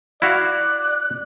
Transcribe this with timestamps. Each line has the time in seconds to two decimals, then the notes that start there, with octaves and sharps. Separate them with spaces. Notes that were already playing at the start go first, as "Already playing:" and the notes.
0.22 E4 F#4 D5 F5 F#6